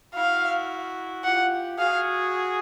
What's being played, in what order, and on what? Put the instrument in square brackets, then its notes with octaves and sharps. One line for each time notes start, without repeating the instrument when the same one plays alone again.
[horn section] E4 F#4 [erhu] F5
[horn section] F4 G4 [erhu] F#5
[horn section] F#4 G#4 [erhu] F5